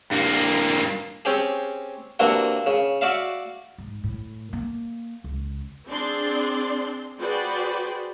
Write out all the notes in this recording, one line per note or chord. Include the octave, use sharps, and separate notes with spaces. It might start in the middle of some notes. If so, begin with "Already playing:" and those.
G2 A#3
C4 C#4 G4 G#4
C3 E3 A#3 D4 F#4
C#3
F#4 D5 E5 F5
G#2
A2
A#3
C#2
C4 D4 G#4 D5 C6
F#4 G#4 B4 C5 D5 G5